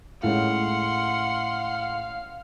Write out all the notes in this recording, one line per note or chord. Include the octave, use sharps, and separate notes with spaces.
A2 G#3 C#4 F5 F#5 C6